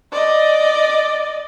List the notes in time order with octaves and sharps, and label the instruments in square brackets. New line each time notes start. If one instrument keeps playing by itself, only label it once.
[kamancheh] D5 D#5